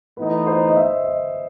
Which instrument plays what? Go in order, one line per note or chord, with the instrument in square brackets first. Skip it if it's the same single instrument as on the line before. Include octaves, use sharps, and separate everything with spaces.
[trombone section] A2 E3 B3 D#4 [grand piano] B4
[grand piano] C5
D#5
E5
D#5